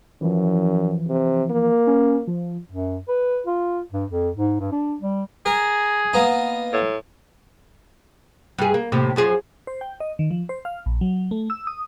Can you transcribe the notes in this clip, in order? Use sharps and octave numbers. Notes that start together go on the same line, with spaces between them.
F#2 E3 F3
C3
A#3
C#4
F3
F#2
B4
F4
G2
F2
G#2
G2
D4
G3
G#4 A#4
A#3 B3 D#4
A2
G2 G#4
A#3
D#2 A2 C3
F#2 F3 G#4
C5
G5
D#5
D#3
F3
C5
F5
A#1
F#3
A3
E6
D#6